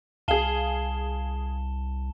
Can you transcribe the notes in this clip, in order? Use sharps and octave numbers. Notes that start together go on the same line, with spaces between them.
C2 G#4 F5 A5 E7 G7